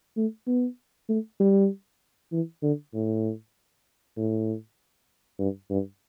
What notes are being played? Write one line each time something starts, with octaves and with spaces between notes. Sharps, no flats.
A3
B3
A3
G3
E3
D3
A2
A2
G2
G2